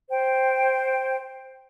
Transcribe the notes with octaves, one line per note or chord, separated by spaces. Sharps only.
C5 G5